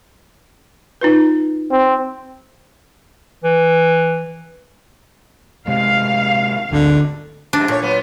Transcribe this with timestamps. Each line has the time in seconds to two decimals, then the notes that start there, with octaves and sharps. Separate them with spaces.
1.01 D#4 F4 B4
1.71 C4
3.44 E3
5.68 C3 G#3 F5
6.71 G#1 D2 D3
7.53 F2 G#2 C3 D4
7.68 A#2 A3 C#5
7.82 F#3 B3 F4